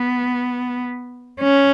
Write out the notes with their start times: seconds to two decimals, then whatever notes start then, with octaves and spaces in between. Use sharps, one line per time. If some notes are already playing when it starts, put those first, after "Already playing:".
Already playing: B3
1.42 C#4